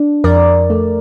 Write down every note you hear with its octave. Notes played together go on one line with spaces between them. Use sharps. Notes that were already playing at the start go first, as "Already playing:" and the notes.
Already playing: D4
F2 A#4 D5
A3